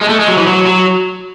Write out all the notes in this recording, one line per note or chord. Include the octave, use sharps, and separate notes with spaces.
G#3
A3
G#3
F#3
E3
F#3
F#3